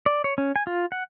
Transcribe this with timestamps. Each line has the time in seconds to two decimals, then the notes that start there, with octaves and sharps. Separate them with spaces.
0.06 D5
0.24 C#5
0.38 C#4
0.56 G#5
0.67 F4
0.92 F#5